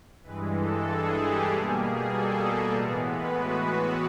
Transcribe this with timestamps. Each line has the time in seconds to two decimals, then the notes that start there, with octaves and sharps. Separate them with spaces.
0.23 G2 E3 G#3 B4
0.54 A4
0.85 G#4
1.16 G4
1.46 B2 G3 A#3 G#4
1.77 G#4
2.08 A4
2.38 A4
2.69 A2 E3 G#3 B3 A#4
3.00 B4
3.30 F#4